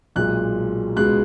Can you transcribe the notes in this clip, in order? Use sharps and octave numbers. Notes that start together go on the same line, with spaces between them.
B1 A#2 G#3 F#6
C#2 B2 G#3 F#6